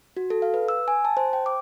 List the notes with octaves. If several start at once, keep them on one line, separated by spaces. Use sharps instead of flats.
F#4
A4
F5
B4
E6
G#5
A5
C5
G5
D6